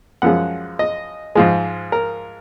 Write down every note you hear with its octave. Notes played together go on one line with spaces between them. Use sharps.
F#2 F3 G#3 F#5
D#5
G#2 F3 G#3
A#4